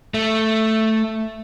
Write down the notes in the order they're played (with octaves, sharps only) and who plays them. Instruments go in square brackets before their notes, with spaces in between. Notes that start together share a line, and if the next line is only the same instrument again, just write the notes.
[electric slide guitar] A3